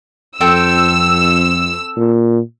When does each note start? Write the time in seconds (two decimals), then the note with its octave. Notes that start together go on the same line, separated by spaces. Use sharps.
0.41 F2 C4 A4 G5 E6
1.98 A#2